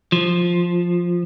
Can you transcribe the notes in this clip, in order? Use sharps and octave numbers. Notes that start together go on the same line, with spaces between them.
F3